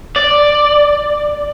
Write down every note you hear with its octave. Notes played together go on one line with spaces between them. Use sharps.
D5